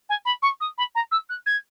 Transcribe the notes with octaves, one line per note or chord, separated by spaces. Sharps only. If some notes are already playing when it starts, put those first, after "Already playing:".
G#5
B5
C#6
D#6
B5
A#5
E6
F#6
G#6